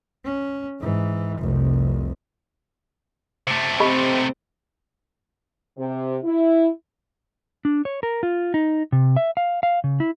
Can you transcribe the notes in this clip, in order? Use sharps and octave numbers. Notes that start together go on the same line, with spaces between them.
C#4
G#2 E3
F1 C2
C3 A3
C4 G4 D#5 B5
C3
E4
D4
C#5
A#4
F4
D#4
C3
E5
F5
F5
C#3
E4